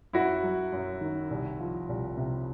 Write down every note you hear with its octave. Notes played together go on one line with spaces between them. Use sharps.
F#2 E4 F#4
F#3
F#2
D#3
C2
F3
C2
C3